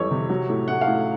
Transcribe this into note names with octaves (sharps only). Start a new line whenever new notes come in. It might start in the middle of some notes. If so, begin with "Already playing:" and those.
Already playing: F2 E3 G3 C#5
C3
F#3
A2
A2 F#5
F5
A2